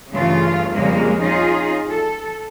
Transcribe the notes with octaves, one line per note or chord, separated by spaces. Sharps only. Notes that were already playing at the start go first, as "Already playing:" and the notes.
G2 C#3 E3 A3 F4
F2 A#2 C#3 G3 G#3 A#3
C#4 D#4 F4 G#4
A4